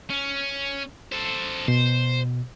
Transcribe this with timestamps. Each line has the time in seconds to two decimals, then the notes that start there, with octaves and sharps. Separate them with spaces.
0.10 C#4
1.12 A4 C5
1.68 B2 C5